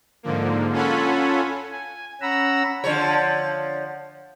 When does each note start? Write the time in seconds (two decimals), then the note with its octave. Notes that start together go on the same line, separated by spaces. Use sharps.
0.23 G#2 D3 F3 A#3
0.72 C#4 F4 A4 F#5 G#5 B5
1.71 G#5
2.21 C#4 F#5 A#5 B5 E6
2.84 D3 F3 C#5